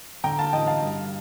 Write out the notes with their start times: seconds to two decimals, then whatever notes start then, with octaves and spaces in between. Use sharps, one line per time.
0.24 D3 G5 A#5
0.39 F5 A5
0.53 A1 D#5 G5
0.67 F5 A5
0.82 G2